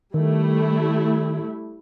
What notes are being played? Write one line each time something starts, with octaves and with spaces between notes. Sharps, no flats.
D#3 G3 A3 E4